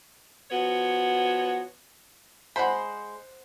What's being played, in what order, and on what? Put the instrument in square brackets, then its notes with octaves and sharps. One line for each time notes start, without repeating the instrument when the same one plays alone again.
[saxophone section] F3 B3 F#4 C#5
[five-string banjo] G#3 B5 [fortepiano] C5 F#5